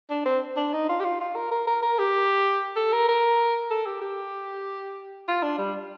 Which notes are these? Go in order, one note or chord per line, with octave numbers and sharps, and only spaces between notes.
D4
C4
D4
D#4
F4
G4
F4
F4
A#4
A#4
A#4
A#4
G4
A4
A#4
A#4
A4
G4
G4
F4
D4
G3